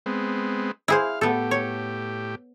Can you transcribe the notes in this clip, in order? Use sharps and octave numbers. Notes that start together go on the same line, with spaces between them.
G#3 B3 C4
E4 G#4 C5 F5
A2 B3 G4 A4
C#5